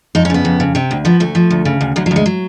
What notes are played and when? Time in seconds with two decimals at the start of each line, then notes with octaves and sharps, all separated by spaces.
0.15 F2 D#4
0.25 C#4
0.30 C#3 B3
0.45 F2
0.60 C#3
0.75 C3 C4
0.91 D2
1.05 F3 B3
1.20 D2 A3
1.35 F3
1.50 D2
1.65 C#3
1.81 D2
1.96 D2 F#3
2.06 F#3
2.11 D2
2.16 G#3
2.26 F#3